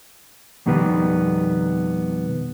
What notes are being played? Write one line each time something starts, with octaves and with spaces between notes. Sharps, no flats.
F2 B2 D#3 G3 B3